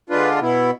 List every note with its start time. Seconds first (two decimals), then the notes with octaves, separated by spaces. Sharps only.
0.10 D3 G#3 D4 F4 B4
0.41 B2 B3 E4